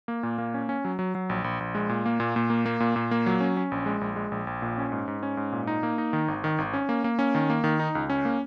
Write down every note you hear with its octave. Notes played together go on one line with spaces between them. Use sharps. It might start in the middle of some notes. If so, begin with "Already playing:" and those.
A#3
A#2
A#3
C#4
C#4
F#3
F#3
F#3
A#1
A#1
A#1
G#3
A#2
A#3
A#2
A#2
A#3
A#3
A#2
A#2
A#3
F#3
C#4
C#4
A#1
G#3
A#1
G#3
A#1
A#1
A#2
C#4
G#2
G#2
C#4
G#2
A#2
D#4
A#3
D#4
D#3
G#1
D#3
G#1
C#4
A#3
A#3
C#4
D#3
A#3
D#3
D#4
C#2
C#4
A#3